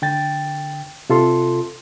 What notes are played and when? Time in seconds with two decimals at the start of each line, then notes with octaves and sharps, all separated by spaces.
0.02 D3 G5 A6
1.10 C3 F4 A4 C6